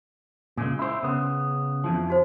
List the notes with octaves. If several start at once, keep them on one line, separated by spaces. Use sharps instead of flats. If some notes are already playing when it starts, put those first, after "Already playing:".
A#2 C#3 G#3 G#5
E4 C5
C#3 B3
F2 E3 F3
D#4 F#4 C5